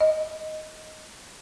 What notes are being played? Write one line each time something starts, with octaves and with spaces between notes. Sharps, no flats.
D#5